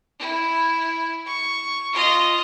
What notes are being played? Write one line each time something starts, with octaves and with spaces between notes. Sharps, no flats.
E4
C#6
F4 D#5